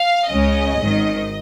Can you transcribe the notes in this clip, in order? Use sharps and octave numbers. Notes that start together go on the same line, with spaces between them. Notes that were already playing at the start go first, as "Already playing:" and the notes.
Already playing: F5
C#2 C#3 G#3 C#4 D#5
G#1 G#2 D#3